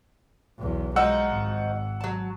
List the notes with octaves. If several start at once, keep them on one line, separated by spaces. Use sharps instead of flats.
B1 E2
F3 G#3 D#4 F#4 F#5 E6
G#1
F#3 A5